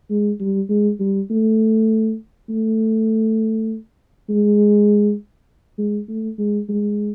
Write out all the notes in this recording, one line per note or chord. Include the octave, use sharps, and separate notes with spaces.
G#3
G3
G#3
G3
A3
A3
G#3
G#3
A3
G#3
G#3